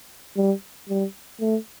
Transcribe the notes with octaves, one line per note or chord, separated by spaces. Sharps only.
G3
G3
A3